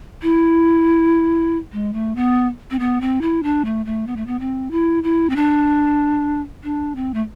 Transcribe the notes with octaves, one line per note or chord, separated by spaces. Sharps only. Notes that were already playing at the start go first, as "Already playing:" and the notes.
E4
G#3
A3
B3
C4
B3
C4
E4
D4
A3
A3
B3
A3
B3
C4
E4
E4
C4
D4
D4
C4
A3